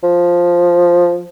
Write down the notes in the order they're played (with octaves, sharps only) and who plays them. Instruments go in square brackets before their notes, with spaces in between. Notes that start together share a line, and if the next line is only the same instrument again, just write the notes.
[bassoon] F3